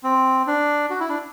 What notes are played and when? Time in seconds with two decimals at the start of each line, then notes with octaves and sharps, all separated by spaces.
0.03 C4
0.47 D4
0.90 F#4
1.00 E4
1.09 D4